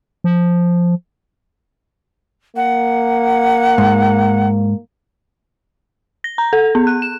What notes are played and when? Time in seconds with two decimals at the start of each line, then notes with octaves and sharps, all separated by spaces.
0.24 F3
2.56 A#3 F#5
3.78 G#2
6.24 A#6
6.38 A#5
6.53 A4
6.75 B3
6.87 F#6
7.02 E7